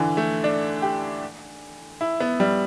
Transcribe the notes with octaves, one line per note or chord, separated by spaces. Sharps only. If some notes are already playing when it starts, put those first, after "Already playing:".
Already playing: D3 E3
A3
D4
G4
E4
B3
G3